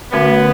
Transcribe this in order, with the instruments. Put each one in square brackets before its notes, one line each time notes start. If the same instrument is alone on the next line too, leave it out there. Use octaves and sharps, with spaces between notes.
[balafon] D3 A3 C#4 F#4 C#5 [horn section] B3